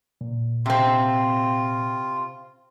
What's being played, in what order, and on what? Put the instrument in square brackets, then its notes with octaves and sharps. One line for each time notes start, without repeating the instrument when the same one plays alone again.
[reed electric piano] A#2
[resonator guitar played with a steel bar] C3 C4 [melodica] F4